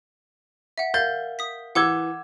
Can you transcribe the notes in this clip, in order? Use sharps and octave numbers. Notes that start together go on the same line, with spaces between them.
E5 F#5
A#4 F5 G6 A6
D#6 B6
E3 F#5 D6 E6 G#6 G7